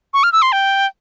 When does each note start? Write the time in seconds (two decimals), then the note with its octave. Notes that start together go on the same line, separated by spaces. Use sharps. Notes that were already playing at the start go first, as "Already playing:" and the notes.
0.14 C#6
0.23 F6
0.33 E6
0.42 C6
0.52 G5